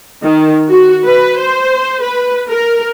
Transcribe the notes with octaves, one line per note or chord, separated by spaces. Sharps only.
D#3
F#4
B4
C5
B4
A#4